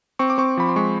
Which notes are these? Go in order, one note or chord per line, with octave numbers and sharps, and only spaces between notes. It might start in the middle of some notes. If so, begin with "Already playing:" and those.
C4 C#6
D6
C4 C#6
F3 B5
C6
G#3 C#6